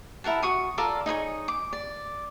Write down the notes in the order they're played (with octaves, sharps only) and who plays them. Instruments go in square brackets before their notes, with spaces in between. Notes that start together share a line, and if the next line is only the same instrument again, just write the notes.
[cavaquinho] E4 A#4 F#5 A5
F#4 C#6 D#6
F4 A4 A#4 D5
D#4 G#4 C5 C#5
D6
D5